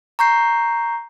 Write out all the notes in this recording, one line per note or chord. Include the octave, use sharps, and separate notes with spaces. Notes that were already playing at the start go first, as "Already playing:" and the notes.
A#5 C#6 G6 C7